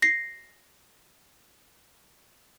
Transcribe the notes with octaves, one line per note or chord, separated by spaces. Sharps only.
A#6 C7